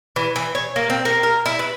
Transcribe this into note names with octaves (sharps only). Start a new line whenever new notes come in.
E3
E3
C#5
A#3
C4
A#3
A#4
E4
B4